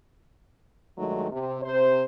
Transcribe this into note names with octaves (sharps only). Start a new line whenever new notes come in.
G2 D#3 F#3 G#3 A3 D#4
C3
C3 C5